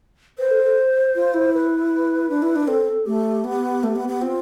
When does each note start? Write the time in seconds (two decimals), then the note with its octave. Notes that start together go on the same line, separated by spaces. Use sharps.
0.39 B4 C5
0.51 A4
0.64 A4
1.15 F4
1.34 E4
1.54 B4
2.29 D4
2.42 E4
2.56 D4
2.68 C4 A4
3.06 A3 G4
3.44 B3
3.83 A3
3.96 B3
4.08 B3
4.22 C4 F4